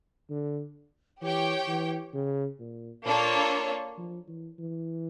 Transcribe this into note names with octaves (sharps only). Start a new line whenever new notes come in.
D3
E3 G4 C#5 G5
E3
C#3
A#2
A#2 A#3 D4 F4 A4 C#5
F3
E3
E3